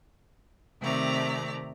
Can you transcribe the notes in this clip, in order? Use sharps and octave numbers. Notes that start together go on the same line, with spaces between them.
C3 D#3 A3 C4 D5 A#5